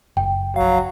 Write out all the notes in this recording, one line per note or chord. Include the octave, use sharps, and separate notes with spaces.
F#1 G5
A#1 F#3 F5